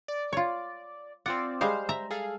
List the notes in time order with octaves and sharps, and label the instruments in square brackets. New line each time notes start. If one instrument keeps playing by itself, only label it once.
[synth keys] D5
[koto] F4 C#5
[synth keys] C4 F4 D5 [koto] F#5
[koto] G3 G#3 F5 [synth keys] C5
[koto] E5 A#5
[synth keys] G#4 A4 F5